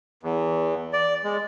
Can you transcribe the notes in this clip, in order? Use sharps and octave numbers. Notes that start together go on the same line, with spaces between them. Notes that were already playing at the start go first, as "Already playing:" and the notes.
E2
D5
G#3